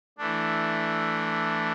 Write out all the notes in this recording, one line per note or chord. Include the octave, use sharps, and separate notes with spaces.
E3 A3 D4